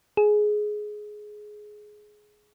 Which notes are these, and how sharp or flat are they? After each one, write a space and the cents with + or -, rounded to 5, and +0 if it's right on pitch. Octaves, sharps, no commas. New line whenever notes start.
G#4 +15